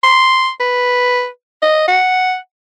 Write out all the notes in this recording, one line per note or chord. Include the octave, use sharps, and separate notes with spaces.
C6
B4
D#5
F#5